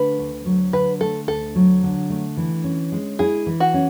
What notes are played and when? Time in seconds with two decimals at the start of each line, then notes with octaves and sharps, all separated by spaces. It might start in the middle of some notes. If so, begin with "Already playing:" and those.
Already playing: D3 A3 B4
0.19 D2
0.45 F#3
0.73 D3 B4
1.01 A3 A4
1.28 D2 A4
1.55 F#3
1.83 D3
2.10 A3
2.37 E3
2.64 C#4
2.92 G#3
3.19 E4 G#4
3.47 E3
3.60 F#4
3.74 C#4